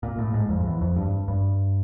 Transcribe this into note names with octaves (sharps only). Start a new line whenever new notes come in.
A#2
A2
G#2
F2
E2
F2
G2
G2